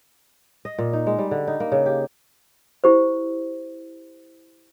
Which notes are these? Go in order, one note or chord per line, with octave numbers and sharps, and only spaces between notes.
D#5
A#2
D#4
G#3
G3
D3
D#4
A#3
C#3
G4
E4 G4 C5